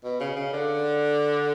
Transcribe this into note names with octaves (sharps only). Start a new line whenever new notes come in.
B2
C#3
C#3
D3